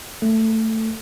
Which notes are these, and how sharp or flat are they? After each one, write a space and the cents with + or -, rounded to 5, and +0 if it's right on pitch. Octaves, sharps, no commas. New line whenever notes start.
A3 +15 A4 +10